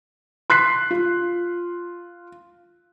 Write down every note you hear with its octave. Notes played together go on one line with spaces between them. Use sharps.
C6 F#6 B6 C7
F4